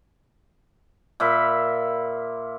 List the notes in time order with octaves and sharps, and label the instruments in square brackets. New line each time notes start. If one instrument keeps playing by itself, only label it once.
[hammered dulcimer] A#2 E5 F5 B5